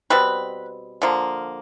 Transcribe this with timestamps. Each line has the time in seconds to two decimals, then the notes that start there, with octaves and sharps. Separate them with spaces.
0.10 B2 G3 C4 B4
1.02 D3 F3 A#3